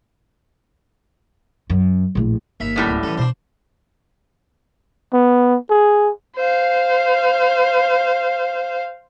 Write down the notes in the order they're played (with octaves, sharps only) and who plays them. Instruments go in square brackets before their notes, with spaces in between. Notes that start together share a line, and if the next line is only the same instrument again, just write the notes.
[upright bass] F#2
A#1 A2
[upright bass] G1 [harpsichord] D#2 E5 B5
[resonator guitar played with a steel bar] F#2 A2 G3
[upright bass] D1
[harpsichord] E3 A4 [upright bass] C#4
[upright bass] B2 [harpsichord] D4 C5
[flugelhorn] B3
G#4
[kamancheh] C5 F5